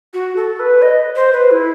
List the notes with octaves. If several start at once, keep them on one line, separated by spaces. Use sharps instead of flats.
F#4
A4
B4
D#5
C5
B4
E4